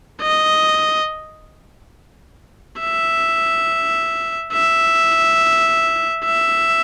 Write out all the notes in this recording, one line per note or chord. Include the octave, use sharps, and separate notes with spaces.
D#5
E5
E5
E5